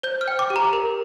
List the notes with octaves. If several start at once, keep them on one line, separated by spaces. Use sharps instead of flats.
C5 G6
F6
G5
D6
G4
A#5
A#4